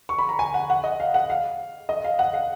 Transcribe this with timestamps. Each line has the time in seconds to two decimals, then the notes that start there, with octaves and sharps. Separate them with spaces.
0.09 C#6
0.19 B5
0.29 A#5
0.39 G#5
0.54 F#5
0.70 F#5
0.84 D#5
1.00 F5
1.14 F#5
1.30 F5
1.89 D#5
2.04 F5
2.19 F#5
2.34 F5